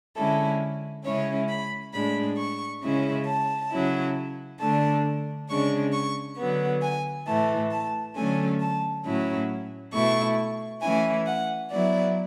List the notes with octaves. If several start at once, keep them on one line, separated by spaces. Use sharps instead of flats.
D3 G#3 C#4 E4 A4
C#3 G#3 C#4 E4 C#5
B5
A2 G#3 D4 B5
C#6
C#3 G#3 C#4 E4
A5
C#3 F#3 C#4 E4
D3 A3 D4 A5
C#3 G#3 D4 C#6
C#6
D3 F#3 B3
G#5
A2 E3 A3 A5
A5
D3 F#3 A3 C#4 G#5
A5
A2 F#3 C#4 E4
B2 A3 E4 C#6
E3 A3 C#4 E4 G#5
F#5
F#3 B3 E4 D5